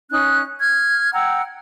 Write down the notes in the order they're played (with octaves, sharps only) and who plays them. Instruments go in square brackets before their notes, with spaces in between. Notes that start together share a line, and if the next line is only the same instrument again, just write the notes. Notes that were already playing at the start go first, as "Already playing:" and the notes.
[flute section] C#4 D#4 F#6
F6 G#6
F#5 G5 A#5 E6